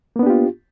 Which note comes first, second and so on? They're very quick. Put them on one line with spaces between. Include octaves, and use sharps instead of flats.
A#3 B3 D4 G4 F4